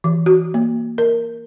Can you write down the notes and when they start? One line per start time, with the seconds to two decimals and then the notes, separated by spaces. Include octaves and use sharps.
0.04 E3
0.26 F#4
0.54 A#3
0.98 A#4